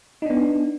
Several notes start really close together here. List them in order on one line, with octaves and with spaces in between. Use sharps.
D#4 D4 B3